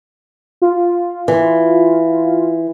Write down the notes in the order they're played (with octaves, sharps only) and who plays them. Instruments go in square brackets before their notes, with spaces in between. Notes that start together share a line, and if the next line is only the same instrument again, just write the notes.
[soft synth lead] F4
[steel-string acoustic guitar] E3